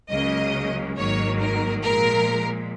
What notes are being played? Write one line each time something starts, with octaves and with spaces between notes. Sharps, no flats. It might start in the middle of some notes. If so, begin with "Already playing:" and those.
C#2 C#3 F#3 A#3 C#4 D#5
G#1 G#2 D#3 F#3 A#3 C#5
A#4
A#2 F3 G#3 A#4